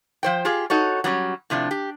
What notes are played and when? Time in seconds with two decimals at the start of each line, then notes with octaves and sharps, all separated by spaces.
0.23 F3 C5 G5
0.45 F4 G4 G#4
0.70 D#4 F#4 A4 C#5
1.04 F#3 G3 B3 C#4
1.50 A2 C3 F3 D4
1.71 G4